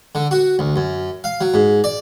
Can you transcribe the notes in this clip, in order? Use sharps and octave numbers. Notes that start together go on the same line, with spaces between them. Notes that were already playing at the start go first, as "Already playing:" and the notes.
D3
F#4
D2
F#2
F5
F#3
G#2
D5